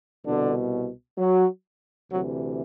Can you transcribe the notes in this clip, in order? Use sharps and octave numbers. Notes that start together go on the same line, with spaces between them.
C2 B2 D3 D4
F#3
D2 C3 E3 F#3